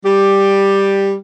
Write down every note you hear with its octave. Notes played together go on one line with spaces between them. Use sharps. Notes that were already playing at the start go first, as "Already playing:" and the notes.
G3 G4